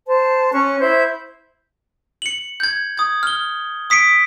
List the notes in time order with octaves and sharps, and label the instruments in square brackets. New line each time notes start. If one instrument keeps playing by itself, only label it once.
[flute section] C5 A5
C#4 C#6 F#6
E4 C5 G6
[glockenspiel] C#7 F#7
G6 G#6
D#6 G#6
F6 G7
D#6 B6 C#7 D7